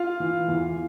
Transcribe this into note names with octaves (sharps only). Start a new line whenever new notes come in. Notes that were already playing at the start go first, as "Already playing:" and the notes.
Already playing: F4 F5
E3
E2